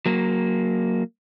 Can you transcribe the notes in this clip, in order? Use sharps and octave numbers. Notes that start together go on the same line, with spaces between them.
F#3 A#3